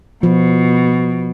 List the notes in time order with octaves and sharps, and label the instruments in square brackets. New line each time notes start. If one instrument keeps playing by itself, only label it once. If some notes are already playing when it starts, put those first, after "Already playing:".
[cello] B2 [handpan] F3